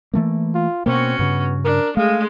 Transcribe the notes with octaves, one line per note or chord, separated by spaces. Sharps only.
E3 A3 A#3
F4
B2 A#3 C4 C#4 F#4
G2 C#3 B3
D4 A#4
G#3 A3 F5